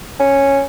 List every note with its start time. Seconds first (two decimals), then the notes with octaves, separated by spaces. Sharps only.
0.20 C#4